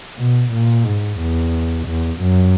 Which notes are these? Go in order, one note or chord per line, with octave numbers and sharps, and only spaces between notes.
B2
A#2
G#2
E2
E2
F#2